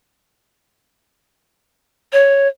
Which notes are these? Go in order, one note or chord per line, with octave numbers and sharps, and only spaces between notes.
C#5